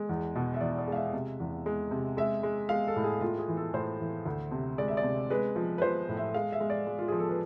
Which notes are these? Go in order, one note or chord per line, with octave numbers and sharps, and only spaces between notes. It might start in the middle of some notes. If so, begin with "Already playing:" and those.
Already playing: G#3
E2
B2
E5
E2 D5
D5
G#3 F5
E5
C3
E2
G#3
C3
G#3 E5
G#3
G#3 F5
A4
A2
G#4
A2 F4
G#4
E3
A4
A2 C5
E3
D2
C3
G#3 D5
E5
D5
C3
G#3 B4
F3
B4
F3 C5
A2
E5
G#3 F5
E5
G#3
D5
G#3
F4
F3 G#4
A4
B4